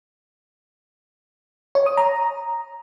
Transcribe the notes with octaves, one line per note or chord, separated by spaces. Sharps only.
C#5
D#6
A#5